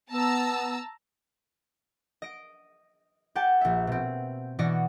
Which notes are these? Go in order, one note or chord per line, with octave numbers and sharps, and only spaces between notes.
B3 A5 A#5 E6
D#5 D7
G4 F#5 G5 A5
A#1 E5
B2 C4
B2 E3 F#4 D5 D#5 C#7